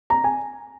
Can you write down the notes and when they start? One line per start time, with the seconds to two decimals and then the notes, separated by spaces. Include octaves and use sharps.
0.10 A#5
0.24 G#5